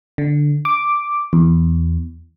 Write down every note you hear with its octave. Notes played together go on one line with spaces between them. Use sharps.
D3
D6
E2